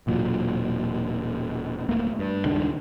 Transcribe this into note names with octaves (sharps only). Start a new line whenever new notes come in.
E1 A#2 F#3
D1 A3 A#3
G2
D#1 C#2 D#3 D4